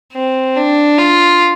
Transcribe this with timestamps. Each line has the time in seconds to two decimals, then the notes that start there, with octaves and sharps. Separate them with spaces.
0.13 C4
0.56 D4
0.98 F4